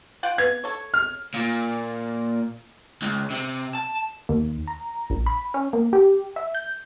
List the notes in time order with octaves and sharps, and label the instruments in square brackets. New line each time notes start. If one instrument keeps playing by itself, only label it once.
[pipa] F4 F#5 G5
[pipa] B3 [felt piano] G#6
[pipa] A4 C#5
[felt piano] F6
[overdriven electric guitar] A#2
C#2
C3
A5
[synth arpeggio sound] D#2
A#5
A#1
B5
C#4
A#3
G4
E5
G6